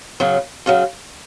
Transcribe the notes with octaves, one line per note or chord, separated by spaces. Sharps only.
F#2 C#3 F#3
F#2 C#3 F#3